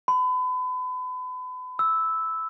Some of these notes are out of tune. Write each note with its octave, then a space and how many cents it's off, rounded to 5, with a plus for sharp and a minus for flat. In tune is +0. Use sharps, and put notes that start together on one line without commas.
B5 +35
E6 -10